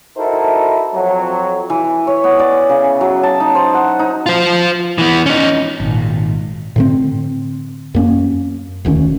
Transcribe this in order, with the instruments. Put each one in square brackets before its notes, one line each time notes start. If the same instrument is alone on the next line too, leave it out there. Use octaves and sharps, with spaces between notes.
[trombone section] D#4 E4 F#4 A4 A#4 C5
F2 F#3
[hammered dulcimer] E3
C#5
B3
D5
C#3
F#3
A5
D#4
C5
F#5
D#4
[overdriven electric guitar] F4 C5
E3 B3
C#4 D#4
[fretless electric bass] G#1 A#2
A2 D3 C4
F#2 A#3 C#4
E1 D2 D#3 C#4